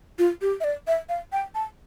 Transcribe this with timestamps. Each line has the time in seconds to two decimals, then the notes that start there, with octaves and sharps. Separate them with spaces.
0.19 F4
0.42 G4
0.60 E5
0.64 D5
0.87 E5
1.09 F5
1.32 G5
1.55 A5